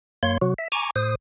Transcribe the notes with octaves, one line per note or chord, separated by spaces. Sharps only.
F#2 A#3 C#5 C6
C3 F#3 F#4
E5
G#5 A#5 C#6 D6
A2 C5 D#6